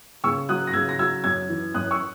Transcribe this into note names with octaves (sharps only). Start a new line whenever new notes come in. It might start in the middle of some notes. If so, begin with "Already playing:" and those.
C#3 C#6 E6
F#3 D#6 F#6
A#6
C#3 E6 G#6
A#6
F#3 E6 G#6
F#2 E6 G#6
E3
F#2 D#6 F#6
C#6 E6